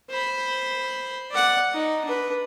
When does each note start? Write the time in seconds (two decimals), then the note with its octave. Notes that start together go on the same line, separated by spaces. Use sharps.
0.10 C5 B5
1.31 D5 F#5
1.73 D#4
2.05 D4 B4